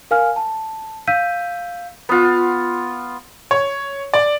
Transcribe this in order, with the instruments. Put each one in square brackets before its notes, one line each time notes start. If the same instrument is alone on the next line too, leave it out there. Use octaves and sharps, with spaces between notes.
[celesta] A#4 F5 G#5 F6
A5
F5 E6 G6 B6 D#7
[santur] B3 F4
[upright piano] C#5
D5